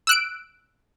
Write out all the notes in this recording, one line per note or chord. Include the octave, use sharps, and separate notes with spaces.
E6 F#6 D7